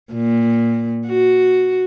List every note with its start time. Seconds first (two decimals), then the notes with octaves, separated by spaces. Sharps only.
0.13 A#2
1.07 F#4